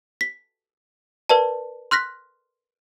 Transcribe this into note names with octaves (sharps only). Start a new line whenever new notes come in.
B6
A#4 B4 D5 A5
C6 F6 F#6 A#6 B6